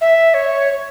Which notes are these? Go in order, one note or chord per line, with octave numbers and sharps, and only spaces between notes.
E5
C#5